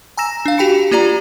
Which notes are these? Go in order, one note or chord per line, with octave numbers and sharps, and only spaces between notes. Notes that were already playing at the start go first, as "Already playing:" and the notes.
G#5 A#5 E6 A#6 E7
D4 F5
F#4 G4 G5 B5 C#7
A#3 F4 G4 D5 A#5